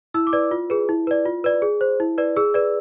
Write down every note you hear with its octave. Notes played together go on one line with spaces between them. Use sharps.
E4 E6
D6
B4 D5
F4
G#4 B4
E4
B4 D5
F4
B4 D5
G#4
C5
E4
B4 D5
G#4 E6
B4 D5